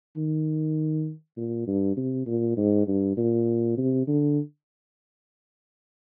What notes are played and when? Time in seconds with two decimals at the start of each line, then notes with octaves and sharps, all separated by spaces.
0.17 D#3
1.37 A#2
1.67 G2
1.97 C3
2.27 A#2
2.57 G#2
2.88 G2
3.17 A#2
3.78 C3
4.07 D3